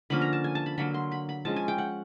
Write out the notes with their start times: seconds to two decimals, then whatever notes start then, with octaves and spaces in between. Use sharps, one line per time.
0.10 D3 F3 A#3 C#4 B5
0.21 A#5
0.33 A5
0.44 G#5
0.55 A5
0.66 B5
0.78 D3 F#3 A#3 B5
0.94 C6
1.12 B5
1.29 B5
1.45 F3 G#3 C#4 A5
1.56 G#5
1.68 G5
1.78 F#5